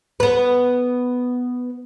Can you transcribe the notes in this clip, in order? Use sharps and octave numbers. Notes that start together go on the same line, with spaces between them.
B3 B4